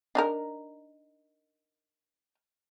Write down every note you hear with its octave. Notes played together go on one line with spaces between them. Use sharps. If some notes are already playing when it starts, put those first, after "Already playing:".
D4 D#4 A#4